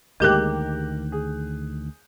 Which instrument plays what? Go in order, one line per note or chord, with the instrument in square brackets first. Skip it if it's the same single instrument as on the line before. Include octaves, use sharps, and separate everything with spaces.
[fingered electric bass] D2 D#3 [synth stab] G#3 G4 [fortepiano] A#3 A#4 [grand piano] F#6 G6
[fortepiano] G#4